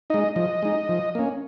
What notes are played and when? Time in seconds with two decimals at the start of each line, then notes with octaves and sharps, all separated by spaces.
0.10 G#3 D#4 D#5
0.36 F3 D#5
0.63 G#3 D#4
0.89 F3
1.15 A#3 C#4